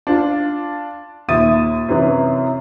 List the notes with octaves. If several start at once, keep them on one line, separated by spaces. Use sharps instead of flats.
D4 F4
D#2 A#2 E5 D#6 A6 D#7
F#2 C3 E3